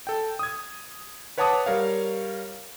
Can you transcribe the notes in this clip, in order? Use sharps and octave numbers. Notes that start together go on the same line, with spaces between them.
A4 G5
D#6 G#6
B4 C#5 F#5 A5 D6 D#6
G3 A#4 C#5 F5